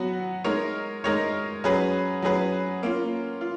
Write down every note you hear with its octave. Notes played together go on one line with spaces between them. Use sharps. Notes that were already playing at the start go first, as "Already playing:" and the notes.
Already playing: F#3 B3 F#4
G#3 D#4 A#4 C#5
G#3 D#4 A#4 C#5
F#3 C#4 G#4 B4
F#3 C#4 G#4 B4
A#3 C#4 F4
F4